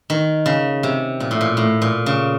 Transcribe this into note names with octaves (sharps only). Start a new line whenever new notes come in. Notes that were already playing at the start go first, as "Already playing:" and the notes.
D#3
C#3
C3
A#2
A2
A#2
A2
A#2
C#3